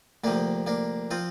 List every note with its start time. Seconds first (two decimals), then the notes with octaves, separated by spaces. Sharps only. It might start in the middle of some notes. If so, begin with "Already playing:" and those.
0.24 D2 C3 F3 A#3 D4
0.67 A#3 D4
1.11 F3 C4 F4